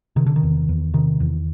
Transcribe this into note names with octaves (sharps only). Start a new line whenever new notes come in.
C3 D#3
D3
D#3
E2
E2
C3 D#3
E2